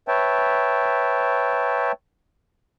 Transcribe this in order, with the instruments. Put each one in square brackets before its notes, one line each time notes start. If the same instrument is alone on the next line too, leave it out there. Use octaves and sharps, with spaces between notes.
[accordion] B4 C#5 E5 G5 A5